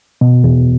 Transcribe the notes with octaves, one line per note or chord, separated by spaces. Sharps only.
B2
E2